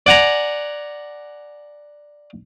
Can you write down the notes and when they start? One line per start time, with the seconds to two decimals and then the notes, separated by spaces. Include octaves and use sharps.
0.06 D5 F#5 G#5 A#5